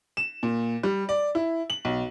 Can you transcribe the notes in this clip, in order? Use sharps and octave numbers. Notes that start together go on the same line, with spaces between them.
E7
A#2
G3
D5
E4
F#7
B1